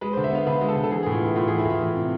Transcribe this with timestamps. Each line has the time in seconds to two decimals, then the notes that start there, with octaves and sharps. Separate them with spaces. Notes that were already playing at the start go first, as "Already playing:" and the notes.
0.01 G#3 B4
0.13 D3 C5
0.24 E5
0.31 B3 F5
0.46 D3 B4
0.61 G#3
0.69 A4
0.76 D3
0.84 A4
0.91 E3 G#4
1.03 A2 G#4
1.14 F4
1.21 B3 E4
1.36 A2 F4
1.48 E3 G#4
1.58 E4
1.65 A2 F4
1.81 E3
1.95 C3